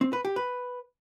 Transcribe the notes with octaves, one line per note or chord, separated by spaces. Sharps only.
C4
B4
G4
B4